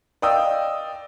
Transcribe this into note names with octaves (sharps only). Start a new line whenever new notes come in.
D5 D#5 F5 G5 D#6 E6